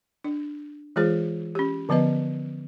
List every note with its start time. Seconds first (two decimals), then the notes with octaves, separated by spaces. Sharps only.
0.24 D4
0.96 E3 G#3 F4 G#4 C5
1.55 C#4 G4
1.89 D3 F3 B3 B4 D#5